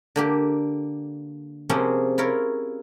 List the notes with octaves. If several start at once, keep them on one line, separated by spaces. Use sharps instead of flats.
D3 A#3 G4
C3 F3 A#3 C4 C#4 G#4
E4 F4 A#4 C#5